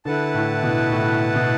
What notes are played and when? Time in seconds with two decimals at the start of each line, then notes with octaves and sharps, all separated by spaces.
0.05 D3 E4 B4 F#5 A5
0.34 A2
0.63 B2
0.91 A2
1.35 B2